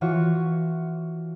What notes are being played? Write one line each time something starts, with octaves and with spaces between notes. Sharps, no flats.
E3 F4 F#4 C#5